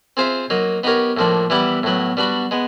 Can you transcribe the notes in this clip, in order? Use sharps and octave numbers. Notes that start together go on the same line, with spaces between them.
C4 F4 G#4 C5 E5
F#3 A#3 D#4
B3 D#4 G4 A#4 C#5
A2 F3 A#3 D4
E3 G3 B3 E4 G4
A2 F#3 B3
G3 B3 D4 F#4
G#3 B3